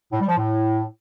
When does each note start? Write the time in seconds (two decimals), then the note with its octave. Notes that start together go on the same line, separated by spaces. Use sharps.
0.12 A2
0.20 G3
0.28 F3
0.37 A2